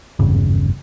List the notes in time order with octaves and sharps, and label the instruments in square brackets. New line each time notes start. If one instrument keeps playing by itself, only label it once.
[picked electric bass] G#1 E2 G2 C#3